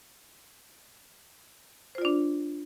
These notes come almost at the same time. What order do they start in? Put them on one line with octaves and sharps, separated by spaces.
C5 F4 D5 D4